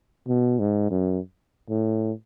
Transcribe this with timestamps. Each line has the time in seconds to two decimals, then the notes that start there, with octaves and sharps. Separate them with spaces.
0.28 B2
0.60 G#2
0.91 F#2
1.70 A2